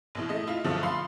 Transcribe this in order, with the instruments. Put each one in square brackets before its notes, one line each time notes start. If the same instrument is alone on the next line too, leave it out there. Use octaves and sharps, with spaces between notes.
[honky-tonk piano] A#1 B2 E3
A3 D#5
E4 F4
G2 B2 D3 F3 F#3 A3
F5 B5 C6